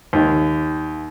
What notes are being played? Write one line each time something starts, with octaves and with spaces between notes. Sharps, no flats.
D#2